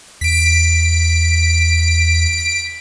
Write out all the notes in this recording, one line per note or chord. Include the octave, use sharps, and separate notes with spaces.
E2 B6 D7